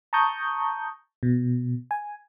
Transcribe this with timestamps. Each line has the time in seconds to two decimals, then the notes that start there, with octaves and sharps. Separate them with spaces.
0.13 A5 A#5 C#6 D#6 G6
1.23 B2
1.91 G#5